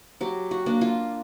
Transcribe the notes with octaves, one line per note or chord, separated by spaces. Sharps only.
F#3 G4
F#4
A#3 D4
F4